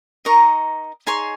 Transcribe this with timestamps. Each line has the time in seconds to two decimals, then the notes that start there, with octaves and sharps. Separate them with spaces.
0.25 D#4 A#4 D#5 A#5 C#6
1.07 D#4 G#4 C#5 G#5 C6